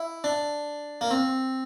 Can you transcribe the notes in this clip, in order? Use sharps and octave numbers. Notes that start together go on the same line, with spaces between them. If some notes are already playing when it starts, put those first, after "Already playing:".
Already playing: E4
D4
A#3
C4